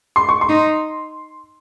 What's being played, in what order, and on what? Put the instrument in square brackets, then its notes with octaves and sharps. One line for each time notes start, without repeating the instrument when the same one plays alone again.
[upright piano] C6
C#6
C6
[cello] D#4